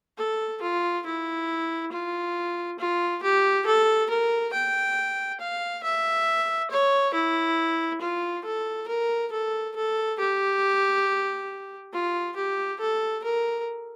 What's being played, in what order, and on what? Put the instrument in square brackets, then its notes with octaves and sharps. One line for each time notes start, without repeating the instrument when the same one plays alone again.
[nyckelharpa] A4
F4
E4
F4
F4
G4
A4
A#4
G5
F5
E5
C#5
E4
F4
A4
A#4
A4
A4
G4
F4
G4
A4
A#4